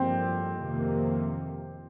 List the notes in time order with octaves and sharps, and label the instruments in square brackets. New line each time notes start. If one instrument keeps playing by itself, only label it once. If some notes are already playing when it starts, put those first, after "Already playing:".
Already playing: [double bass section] G2 D3 F3 A#3 [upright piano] C4 G4
[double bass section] F2 C3 D#3 A#3